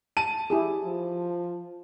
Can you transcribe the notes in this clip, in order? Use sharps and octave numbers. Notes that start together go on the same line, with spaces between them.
A5 D#7
E4 G4 G#4
F3